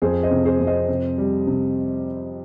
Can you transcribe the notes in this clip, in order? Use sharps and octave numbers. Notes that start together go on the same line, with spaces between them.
F2 G#4 C5
C5 D#5
C3
G#4 C5
F2
C5 D#5
C3
G3
C3